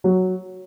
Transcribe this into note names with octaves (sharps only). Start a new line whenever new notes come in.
F#3